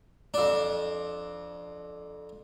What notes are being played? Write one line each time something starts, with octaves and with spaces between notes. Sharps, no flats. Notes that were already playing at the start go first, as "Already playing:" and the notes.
F2 D4